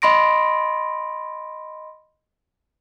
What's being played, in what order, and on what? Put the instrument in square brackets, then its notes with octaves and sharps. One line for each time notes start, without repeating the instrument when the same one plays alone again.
[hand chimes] D#5 B5 C6 A#6 D7